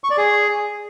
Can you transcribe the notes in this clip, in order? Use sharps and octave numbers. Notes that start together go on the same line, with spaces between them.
C#6
D5
G#4